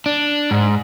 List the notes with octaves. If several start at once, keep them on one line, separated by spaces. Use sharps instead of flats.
D4
G#2